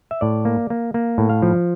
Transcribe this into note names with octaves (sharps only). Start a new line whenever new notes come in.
E5
A2 D5
A#3
A#3
A#3
A2
F5
F3